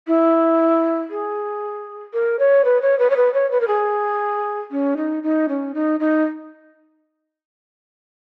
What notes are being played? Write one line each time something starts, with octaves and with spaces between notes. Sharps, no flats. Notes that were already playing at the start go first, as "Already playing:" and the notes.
E4
G#4
A#4
C#5
B4
C#5
B4
C#5
B4
C#5
B4
A#4
G#4
C#4
D#4
D#4
C#4
D#4
D#4